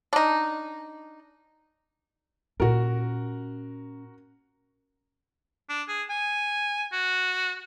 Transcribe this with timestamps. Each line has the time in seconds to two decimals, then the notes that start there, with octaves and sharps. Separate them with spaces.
0.13 D4 D#4
2.60 A#2 C#4 F#4 A#4
5.69 D4
5.88 G#4
6.10 G#5
6.93 F#4